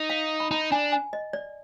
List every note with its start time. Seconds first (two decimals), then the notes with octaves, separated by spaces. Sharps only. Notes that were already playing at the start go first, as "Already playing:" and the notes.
Already playing: D#4
0.10 F5
0.40 B5
0.51 D#4 A#5
0.72 D4 G#5
0.92 G#5
1.13 D#5
1.33 D5